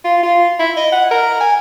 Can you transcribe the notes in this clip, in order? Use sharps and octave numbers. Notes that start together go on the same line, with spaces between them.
F4
F4
E4
D#5
F#5
A#4
G#5